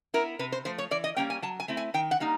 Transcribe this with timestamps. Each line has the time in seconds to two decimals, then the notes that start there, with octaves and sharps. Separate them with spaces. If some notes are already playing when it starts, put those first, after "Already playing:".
0.14 B3 E4 A#4
0.39 C3 B4
0.52 C5
0.65 F3 A3 C5
0.78 C#5
0.91 E3 D5
1.04 D#5
1.16 G3 A#3 C#4 G5
1.30 G#5
1.42 F#3 A5
1.60 G#5
1.68 A3 C4 E4
1.77 G#5
1.94 D#3 G5
2.11 F#5
2.20 G3 A#3 D#4